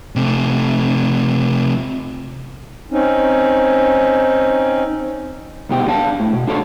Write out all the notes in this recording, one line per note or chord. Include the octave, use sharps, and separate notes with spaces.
C3 A3
C4 C#4 D#4
C2 B2 G4
D4 D5 F5 A5
A2
B2
D4 F4 A4 C#5